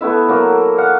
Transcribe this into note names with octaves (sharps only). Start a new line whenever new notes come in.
A3 B3 E4 E5
F#3 A#3
F5 F#5